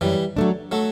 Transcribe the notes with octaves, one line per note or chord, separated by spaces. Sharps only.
F#2 E3 G3
F#3 A3 D4
F#3 A3